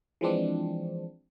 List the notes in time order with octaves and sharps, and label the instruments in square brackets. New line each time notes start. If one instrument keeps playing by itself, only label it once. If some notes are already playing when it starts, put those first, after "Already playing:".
[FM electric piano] E3 F3 G#3 C4 D4